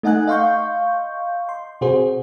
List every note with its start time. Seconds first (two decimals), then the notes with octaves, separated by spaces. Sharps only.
0.03 A3 D#4 D#5 F#5 G#5 F#6
0.28 D#5 F5 C6 C#6 G6
1.49 C6
1.81 C3 F#4 G#4 C5